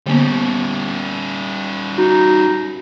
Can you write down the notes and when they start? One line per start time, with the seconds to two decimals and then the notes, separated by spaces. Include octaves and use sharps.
0.07 D3 G3 A#3 B3 C#4
1.98 D#4 F#4